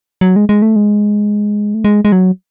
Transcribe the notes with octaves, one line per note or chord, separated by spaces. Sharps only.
F#3
G#3
G#3
A3
G#3
A3
G#3
G#3
F#3